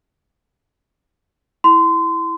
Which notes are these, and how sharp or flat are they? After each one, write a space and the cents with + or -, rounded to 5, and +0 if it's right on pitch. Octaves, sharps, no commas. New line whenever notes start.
E4 +0 C6 -25